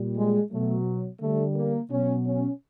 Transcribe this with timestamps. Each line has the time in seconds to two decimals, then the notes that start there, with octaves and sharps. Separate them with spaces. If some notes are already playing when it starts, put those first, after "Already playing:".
Already playing: A#2 G3
0.16 G#3
0.51 B2 F#3 A3
1.20 D3 G3 A3
1.55 A#3
1.90 B2 F#3 C#4
2.25 C#4